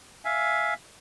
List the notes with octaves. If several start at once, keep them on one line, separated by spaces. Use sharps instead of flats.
E5 F5 G#5